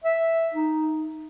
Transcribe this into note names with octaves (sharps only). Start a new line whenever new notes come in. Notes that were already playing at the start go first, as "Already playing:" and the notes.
E5
D#4